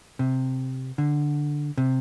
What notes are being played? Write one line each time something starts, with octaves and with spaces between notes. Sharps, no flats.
C3
D3
C3